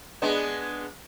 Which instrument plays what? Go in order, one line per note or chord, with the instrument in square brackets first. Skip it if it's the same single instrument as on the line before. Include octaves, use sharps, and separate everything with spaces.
[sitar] G#3 B3 D4